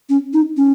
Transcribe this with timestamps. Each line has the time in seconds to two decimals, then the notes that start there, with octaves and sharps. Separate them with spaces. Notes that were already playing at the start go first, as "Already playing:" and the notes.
0.09 C#4
0.33 D#4
0.57 C#4